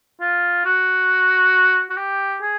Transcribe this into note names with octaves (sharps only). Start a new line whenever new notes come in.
F4
F#4
F#4
G4
G#4